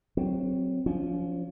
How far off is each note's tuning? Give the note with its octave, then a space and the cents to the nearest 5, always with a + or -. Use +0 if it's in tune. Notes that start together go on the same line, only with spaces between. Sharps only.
F#3 +0 C4 +0
F3 +0 C#4 +35